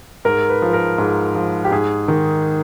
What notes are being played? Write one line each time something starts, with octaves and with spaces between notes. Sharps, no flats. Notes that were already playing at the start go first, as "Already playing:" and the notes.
G#2 A#4
B4
F3
A#4
G#2
F3
G4
G#2 G#4
D#3